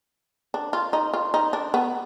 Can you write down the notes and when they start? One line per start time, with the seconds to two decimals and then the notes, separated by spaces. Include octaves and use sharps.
0.54 D4
0.73 F4
0.93 D#4
1.14 F4
1.34 D#4
1.53 D4
1.74 B3